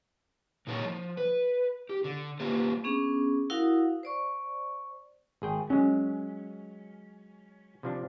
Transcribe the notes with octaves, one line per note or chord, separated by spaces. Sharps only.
A#2 D#4 A#4 C#5 A5
F3
B4
G4
D3
A#3 F4 G4 B4 C5
B3 C#4 D4 G#4
E4 F#4 A#4 F5 F#5 D#6
C5 D5 C#6
G#1 G#4 G5
F#3 G#3 C#4
C3 F3 D4